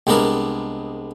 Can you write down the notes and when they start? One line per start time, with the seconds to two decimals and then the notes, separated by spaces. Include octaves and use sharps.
0.07 C2 G#3 B3 D4 A#4